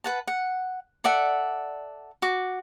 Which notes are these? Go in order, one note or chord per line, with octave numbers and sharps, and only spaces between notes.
B4 F#5 A5
F#5
A4 D5 E5 F#5
F#4 D6